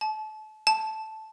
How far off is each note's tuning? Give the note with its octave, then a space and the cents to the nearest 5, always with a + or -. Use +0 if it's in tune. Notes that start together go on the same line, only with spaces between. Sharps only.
A5 -30
A5 -5